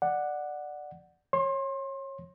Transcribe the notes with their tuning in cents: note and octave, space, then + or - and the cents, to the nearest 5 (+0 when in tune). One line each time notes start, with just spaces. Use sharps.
D5 +15 F#5 +0
C#5 -25 C6 +30